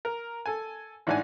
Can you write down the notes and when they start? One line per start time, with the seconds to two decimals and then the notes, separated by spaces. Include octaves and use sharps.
0.05 A#4
0.46 A4 G#5
1.07 A1 G#2 D4 F#5 G#5